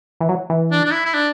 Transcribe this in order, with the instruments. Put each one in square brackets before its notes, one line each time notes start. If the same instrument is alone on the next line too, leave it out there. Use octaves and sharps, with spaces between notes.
[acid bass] E3
F#3
E3
[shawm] D4
D4
E4
E4
D4